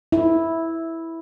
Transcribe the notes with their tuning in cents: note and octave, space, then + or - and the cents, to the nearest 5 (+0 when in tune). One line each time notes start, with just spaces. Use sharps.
E4 -5